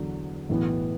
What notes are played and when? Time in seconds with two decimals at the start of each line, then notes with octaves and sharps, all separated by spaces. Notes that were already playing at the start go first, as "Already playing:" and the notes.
Already playing: E2 D3 F#3
0.49 B1 A2 E3 B3